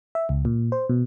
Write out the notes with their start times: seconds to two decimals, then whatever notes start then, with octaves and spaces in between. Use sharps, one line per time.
0.15 E5
0.29 C#2
0.45 A#2
0.72 C5
0.89 B2